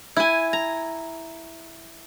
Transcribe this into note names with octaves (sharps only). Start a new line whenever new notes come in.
E4 G#5
A#5